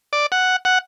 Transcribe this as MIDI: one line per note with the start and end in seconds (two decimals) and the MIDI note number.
0.13 0.26 74
0.32 0.56 78
0.65 0.78 78